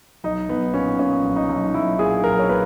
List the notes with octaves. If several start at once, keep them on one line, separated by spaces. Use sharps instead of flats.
B1 D#4
B1 B3
A#2 C#4
A#2 C#4
B1
D#4
B1
B1 E4
A#2 G#4
B1 A#4
C#5
A#2 B4